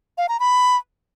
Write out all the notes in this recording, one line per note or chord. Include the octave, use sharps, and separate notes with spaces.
F5
A#5
B5